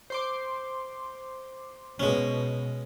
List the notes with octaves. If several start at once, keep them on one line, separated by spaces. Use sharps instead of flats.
C5 C6 D6
B2 G#3 C#4